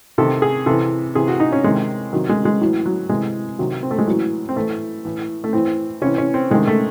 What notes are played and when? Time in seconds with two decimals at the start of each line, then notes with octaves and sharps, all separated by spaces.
0.18 C3 D#3 A4
0.42 G#4
0.66 C3 E3 A4
1.15 C3 E3 G#4
1.28 F#4
1.40 D#4
1.52 C#4
1.64 C3 D#3 G#3
2.13 C3 D#3 F#3
2.29 G#3
2.45 G#3
2.61 A2 E3 F#3
2.86 F#3
3.09 C3 E3 G#3
3.59 C3 D#3 F#3
3.83 C4
3.91 A3
3.99 G#3
4.07 A2 E3 F#3
4.49 C4
4.56 A2 E3 A3
5.05 A2 E3
5.44 A3
5.53 A2 E3 C4
6.01 C3 E3 C#4
6.18 C#4
6.34 C4
6.50 C3 D#3 G#3
6.67 A3